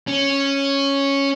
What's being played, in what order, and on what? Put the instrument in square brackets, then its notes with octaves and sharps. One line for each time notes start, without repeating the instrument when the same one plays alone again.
[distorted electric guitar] C#4